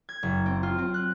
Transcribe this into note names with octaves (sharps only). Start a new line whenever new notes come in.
G#6
F#1
C4
F4
C4
F#6